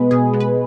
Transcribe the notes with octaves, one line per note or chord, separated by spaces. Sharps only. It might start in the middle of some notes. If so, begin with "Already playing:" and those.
Already playing: B2 G#3 B3 B4
B2 G#4
G#3 B3
B4